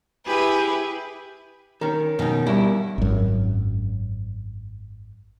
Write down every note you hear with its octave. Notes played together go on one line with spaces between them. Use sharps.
E4 G4 G#4 B4
D#3 C#4 A#4
B2 D#3 C#4 D#4
G2 E4 A#4 C#6
G#1 F#2